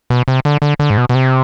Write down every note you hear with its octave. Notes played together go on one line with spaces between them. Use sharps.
B2
C3
D3
D3
D3
G#2
B2
B2
C3